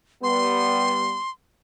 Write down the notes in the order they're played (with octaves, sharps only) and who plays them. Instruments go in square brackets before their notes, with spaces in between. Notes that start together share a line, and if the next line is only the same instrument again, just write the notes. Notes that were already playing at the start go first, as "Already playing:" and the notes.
[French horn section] G3 B3 [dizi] C6